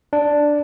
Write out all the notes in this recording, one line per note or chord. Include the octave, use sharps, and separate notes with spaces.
D4